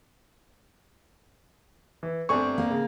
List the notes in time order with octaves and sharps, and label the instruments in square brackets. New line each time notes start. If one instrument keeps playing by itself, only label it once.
[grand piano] E3
[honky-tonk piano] G1 A3 G#5 [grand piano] C4 D4 C#6
[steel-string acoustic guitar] A#3
[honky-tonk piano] C#3